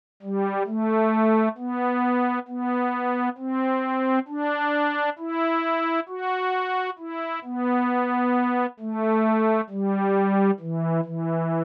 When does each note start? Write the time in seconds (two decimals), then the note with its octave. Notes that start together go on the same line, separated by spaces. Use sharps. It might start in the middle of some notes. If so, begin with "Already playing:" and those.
0.22 G3
0.67 A3
1.58 B3
2.48 B3
3.38 C4
4.28 D4
5.19 E4
6.09 F#4
6.99 E4
7.45 B3
8.80 A3
9.70 G3
10.60 E3
11.05 E3